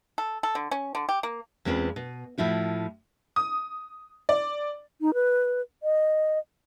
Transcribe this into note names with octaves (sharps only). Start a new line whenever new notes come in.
A4
A4
D3
C#4
D3
G4
A#3
E2 G#3 C4 C#4 F4 B4
B2
A2 F3 E4 F#4
D#6
D5
D#4
B4
D#5